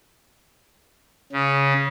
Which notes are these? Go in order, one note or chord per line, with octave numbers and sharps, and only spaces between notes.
C#3